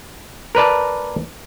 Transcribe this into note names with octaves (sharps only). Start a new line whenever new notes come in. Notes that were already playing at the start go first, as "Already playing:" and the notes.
A#4 B4 D5 A5